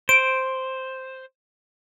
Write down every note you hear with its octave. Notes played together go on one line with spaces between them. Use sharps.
C5 D7